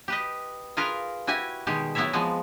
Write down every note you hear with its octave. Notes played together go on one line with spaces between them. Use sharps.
G4 B4 D#5
F4 G#4 A#4 B4 F5
E4 F#4 G4 G#5
B2 D#3 G3 G#3 G4
F#3 B3 E4 A#4 C#5 E5
F3 G#3 B3 C4